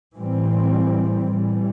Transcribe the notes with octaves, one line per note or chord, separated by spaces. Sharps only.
A2 E3 G3 C4
A2 E3 G3